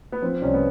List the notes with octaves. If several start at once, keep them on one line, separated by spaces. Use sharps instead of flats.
B3
F3 C4
C2 C#4
B3